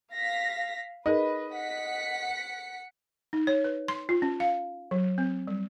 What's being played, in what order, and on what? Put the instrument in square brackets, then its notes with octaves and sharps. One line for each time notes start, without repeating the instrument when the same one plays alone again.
[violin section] F5 A#6 B6
[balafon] D#4 G#4 A#4 [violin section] B4 [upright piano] D#5
[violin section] F#5 B6 C#7
[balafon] D#4
C#5
B4
C6
F4
C#4
F5
F#3
C4
G3